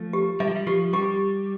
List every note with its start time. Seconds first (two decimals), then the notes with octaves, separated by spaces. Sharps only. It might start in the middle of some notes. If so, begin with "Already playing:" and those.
Already playing: F3 A3
0.13 G4
0.40 G3 E5
0.48 F3
0.55 G3
0.67 F3 G4
0.93 G3 G4